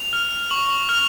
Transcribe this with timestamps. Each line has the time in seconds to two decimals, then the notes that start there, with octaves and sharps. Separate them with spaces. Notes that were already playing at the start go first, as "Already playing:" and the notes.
Already playing: F7
0.13 F6
0.50 C#6 F#7
0.70 F#7
0.89 F6 F7